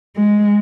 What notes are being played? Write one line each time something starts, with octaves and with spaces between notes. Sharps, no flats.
G#3